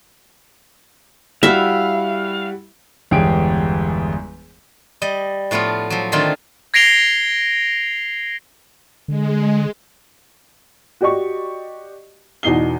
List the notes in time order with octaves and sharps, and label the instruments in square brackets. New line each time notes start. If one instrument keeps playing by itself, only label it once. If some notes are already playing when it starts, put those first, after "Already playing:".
[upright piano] G3 E4 F#4 [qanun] E5 [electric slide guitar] F5
[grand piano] G1 E2 G#3 G4 G#4 D7
[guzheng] G3 D#5
A2 F3 A3 B3 F4
F3 F#3
D3 D#3 A3 C4 D#4 F4
[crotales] G#6 A#6 C7 D7 F7 G7
[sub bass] D3 [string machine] G#3
[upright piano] F#4 G4 D5 D#5 C#6
E2 B2 D#4 C7 G7